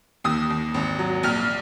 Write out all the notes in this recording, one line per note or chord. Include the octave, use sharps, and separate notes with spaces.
D#2 D#6
D#2
G#1
F#3
A#1 F6